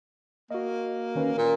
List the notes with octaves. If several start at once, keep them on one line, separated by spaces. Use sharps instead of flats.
A#3 F#4 D#5
D#3 C#4 B4
A#2 A#4